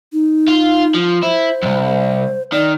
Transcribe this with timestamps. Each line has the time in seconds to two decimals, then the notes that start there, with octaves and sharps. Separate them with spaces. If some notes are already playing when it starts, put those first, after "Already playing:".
0.13 D#4
0.48 F4
0.94 F3
1.23 E4 C5
1.62 C2 F2
2.52 D#3 D5